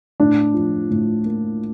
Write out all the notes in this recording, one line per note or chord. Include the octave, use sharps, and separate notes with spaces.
A2 D4
F3
A2
A#3